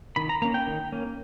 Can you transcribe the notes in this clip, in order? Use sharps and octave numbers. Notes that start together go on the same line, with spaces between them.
D#3 B5
A#5
A#3 C#4 A#5
G5
D#3
A#3 C#4